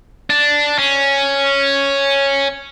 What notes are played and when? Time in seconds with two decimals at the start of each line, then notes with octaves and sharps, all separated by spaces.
0.30 D4
0.79 C#4